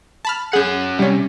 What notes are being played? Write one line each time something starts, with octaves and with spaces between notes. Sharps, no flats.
A5 B5 F6
C#4 G#4 F#5 G6
C3 G3 C#4